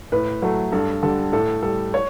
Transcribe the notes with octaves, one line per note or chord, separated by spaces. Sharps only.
A2 B4
F#3 A3
G2 A4
D3 G3 A4
A2 A4
G3 A4
C#5